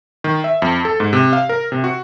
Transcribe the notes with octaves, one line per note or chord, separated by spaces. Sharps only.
D#3
E5
F2
A4
G#2
C3
F5
A#4
C3
F#4